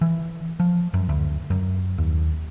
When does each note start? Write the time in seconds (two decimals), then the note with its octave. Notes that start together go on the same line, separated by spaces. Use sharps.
0.01 E3
0.60 F3
0.94 F#2
1.09 D2
1.50 F#2
1.98 D#2